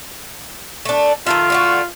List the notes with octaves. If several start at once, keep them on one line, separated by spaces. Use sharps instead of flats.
A3 D4
D#3 F4 A4 E5
D3 A3 F#4